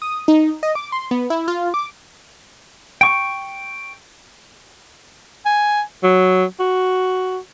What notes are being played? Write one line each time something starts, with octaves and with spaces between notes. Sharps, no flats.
D#6
D#4
D#5
D6
C6
B3
E4
F4
D6
G5 C#6
G#5
F#3
F#4